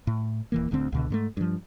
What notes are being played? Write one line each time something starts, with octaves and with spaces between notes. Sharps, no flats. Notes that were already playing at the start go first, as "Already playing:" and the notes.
A2
D#1 E3 A#3
D1 D2 D3 C4
C#2 B2 D3
G#2 G#3 A3
G2 F3